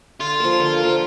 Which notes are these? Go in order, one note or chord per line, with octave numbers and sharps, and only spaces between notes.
D3 F4
F3 A#3
D3
F3 A#3